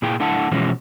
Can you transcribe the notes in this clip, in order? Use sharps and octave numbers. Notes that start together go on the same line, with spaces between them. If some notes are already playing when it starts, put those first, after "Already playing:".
A#2 E4 G#4 G5
A3 D4 E4 F#5 A5
B2 E3 F3 G#3 C#4